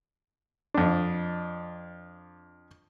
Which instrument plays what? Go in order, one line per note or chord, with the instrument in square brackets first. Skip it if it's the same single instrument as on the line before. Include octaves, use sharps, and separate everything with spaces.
[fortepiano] F2 D4